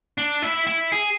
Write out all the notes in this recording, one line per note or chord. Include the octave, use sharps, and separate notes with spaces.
D4
E4
E4
G#4